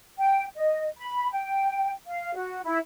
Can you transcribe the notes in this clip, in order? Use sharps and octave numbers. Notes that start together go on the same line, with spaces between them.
G5
D#5
B5
G5
F5
F#4
E4